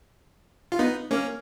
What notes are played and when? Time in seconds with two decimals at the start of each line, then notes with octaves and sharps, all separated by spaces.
0.72 F4
0.79 B3 D#4
1.11 A#3 C#4